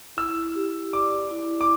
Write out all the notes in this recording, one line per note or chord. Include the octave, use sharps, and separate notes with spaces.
E4 E6
G4
D5 D6
E4
D6